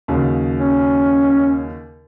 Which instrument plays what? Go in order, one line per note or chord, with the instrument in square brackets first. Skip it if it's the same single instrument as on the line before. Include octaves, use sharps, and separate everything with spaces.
[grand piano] D#2 C#3 F#3
[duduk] C#4